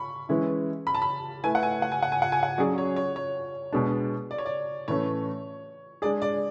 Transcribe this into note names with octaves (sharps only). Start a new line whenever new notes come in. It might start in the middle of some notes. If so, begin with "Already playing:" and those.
Already playing: B5 C#6
E3 G#3 C#4 E4
B5
A5
B5
A3 E4 B4 G#5
F#5
G#5
F#5
G#5
F#5
G#5
F#5
G#5
F#5
F#3 C#4 G#4 D5
C#5
C#5
C#5
B2 G#3 D4
D5
C#5
D5
A2 E3 A3 C#4 C#5
G#3 D4 G#4 D5
D5